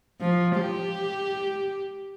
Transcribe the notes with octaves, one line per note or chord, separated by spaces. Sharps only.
F3
G4